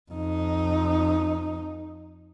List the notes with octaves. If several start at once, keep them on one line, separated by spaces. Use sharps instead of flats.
F2 D#4